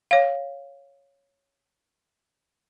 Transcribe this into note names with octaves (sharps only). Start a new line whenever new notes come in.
C#5 F5